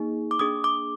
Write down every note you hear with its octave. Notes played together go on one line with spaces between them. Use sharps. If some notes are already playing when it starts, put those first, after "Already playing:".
Already playing: A#3 D#4 G#4
D6
A#3 D4 G#4 D#6
D6